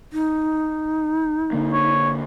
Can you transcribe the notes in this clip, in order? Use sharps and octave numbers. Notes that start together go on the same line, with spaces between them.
D#4
D3 A#3
C#5